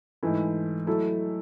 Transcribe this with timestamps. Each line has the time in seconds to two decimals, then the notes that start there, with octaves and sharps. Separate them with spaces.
0.23 G#2 E3 A3 E4
0.87 F#3 A3 E4 A4